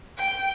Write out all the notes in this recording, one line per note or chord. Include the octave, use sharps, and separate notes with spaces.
G5